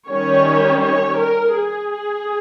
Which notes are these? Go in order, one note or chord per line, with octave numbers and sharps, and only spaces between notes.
D#3 G3 C#4 C#5
C#5
A#4
G#4